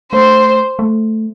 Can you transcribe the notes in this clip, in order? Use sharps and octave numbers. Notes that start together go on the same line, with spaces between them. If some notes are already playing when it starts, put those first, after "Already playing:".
A3 C5
A3